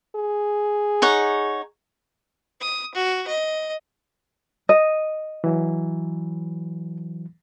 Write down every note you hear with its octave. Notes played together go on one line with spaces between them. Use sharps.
G#4
D#4 C#5 F#5
D#6
F#4
D#5
D#5
E3 F#3